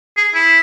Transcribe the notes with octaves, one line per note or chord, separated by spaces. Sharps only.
G#4
E4